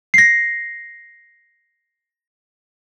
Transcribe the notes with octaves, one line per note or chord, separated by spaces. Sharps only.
A#6 C7